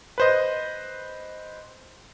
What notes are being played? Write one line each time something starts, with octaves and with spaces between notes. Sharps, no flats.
B4 C5 D#5